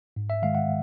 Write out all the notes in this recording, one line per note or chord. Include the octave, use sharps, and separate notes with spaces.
G#2
E5
D#3 G#3 F5
F#5